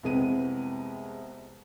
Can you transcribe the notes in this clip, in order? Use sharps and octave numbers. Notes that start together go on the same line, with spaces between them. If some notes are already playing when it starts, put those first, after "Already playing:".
C2 F2 C3 G#3 B3 D#7